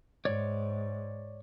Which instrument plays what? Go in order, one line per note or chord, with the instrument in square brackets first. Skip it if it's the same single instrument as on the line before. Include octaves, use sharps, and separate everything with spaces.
[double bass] G#2 [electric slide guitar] C#5 D5